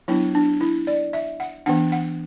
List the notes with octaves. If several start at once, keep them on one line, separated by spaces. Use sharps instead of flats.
F#3 B3 D4 E4
D4
E4
D5
E5
F#5
E3 B3 D4 F#5
F#5